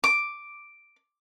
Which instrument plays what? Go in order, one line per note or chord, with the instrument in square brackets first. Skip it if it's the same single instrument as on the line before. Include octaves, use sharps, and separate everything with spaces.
[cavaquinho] D6